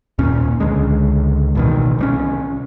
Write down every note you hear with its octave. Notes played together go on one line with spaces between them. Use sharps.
D#2 A#2 C#4
C#2 D3 G#3
A1 B2 D#3
C2 G3 C#4